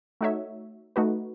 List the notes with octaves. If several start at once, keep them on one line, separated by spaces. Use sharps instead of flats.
A3 D#4 F#4 C#5 E5
A3 D#4 F#4 B4